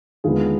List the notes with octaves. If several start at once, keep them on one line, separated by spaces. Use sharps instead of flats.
D#2 D3 G#3 B3 F4 G#4